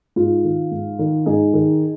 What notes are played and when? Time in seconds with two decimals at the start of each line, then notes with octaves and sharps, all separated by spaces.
0.16 G#2 F4
0.44 D#3
0.71 G#2
0.99 D#3
1.26 G#2 D#4 G#4
1.54 D#3